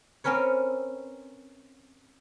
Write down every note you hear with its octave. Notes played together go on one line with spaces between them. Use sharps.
C4 C#4 A#4 B4 C#5